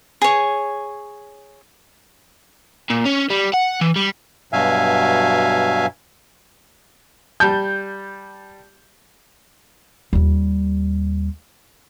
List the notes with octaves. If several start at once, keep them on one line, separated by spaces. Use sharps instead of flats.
G#4 C#5
A#2
C#4
G3
F#5
E3
G3
G2 B2 F#3 E5 F5 G#5
G3 A5 G6
D#2 G3